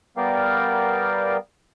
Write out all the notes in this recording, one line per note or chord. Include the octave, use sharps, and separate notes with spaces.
G3 B3 A#4 D5 F5 G5